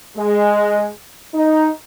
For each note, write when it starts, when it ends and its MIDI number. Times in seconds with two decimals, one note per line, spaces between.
0.17 0.88 56
1.35 1.69 63